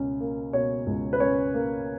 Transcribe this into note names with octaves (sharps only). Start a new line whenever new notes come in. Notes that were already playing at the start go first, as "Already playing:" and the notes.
Already playing: C#2 B2 C#4
A#3
B2 C#5
C#2
B4
C#4 C#5
A#3